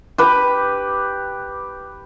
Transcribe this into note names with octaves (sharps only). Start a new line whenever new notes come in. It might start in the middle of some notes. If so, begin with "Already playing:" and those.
G4 B4